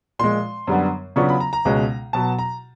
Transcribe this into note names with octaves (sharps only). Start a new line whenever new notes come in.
A#2 F3 G#3 C6
F#2 D3 G3 B3
C#3 F#3 B3 D4 F4 C#6
B5
A#5
A#5
C#2 B2 G#3 C#4
B2 F#3 B3 A5
A#5